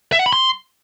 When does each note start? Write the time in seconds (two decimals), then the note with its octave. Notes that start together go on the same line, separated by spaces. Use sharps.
0.12 E5
0.19 F#5
0.26 B5
0.33 C6